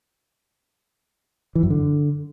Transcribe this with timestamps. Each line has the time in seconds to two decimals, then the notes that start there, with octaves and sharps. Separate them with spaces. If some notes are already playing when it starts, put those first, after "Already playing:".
1.55 E3
1.63 F#2
1.70 D3